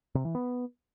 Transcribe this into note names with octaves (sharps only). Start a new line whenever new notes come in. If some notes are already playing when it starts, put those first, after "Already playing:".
C3
E3
B3